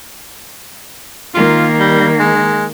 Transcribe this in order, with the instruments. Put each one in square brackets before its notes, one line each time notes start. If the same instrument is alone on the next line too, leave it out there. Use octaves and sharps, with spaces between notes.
[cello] D#3 A#3 [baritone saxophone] F4
[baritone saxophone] G3
G#3